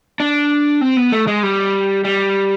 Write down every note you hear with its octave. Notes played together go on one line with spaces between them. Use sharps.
D4
C4
B3
A3
G#3
G3
G3